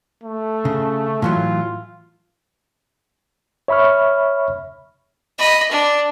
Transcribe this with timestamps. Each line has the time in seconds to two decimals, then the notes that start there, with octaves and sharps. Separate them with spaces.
0.24 A3
0.65 C#3
1.22 A2 E3 F#3 F4
3.68 C#5 E5 B5 C#6 F6
5.39 D#5 B5
5.71 D4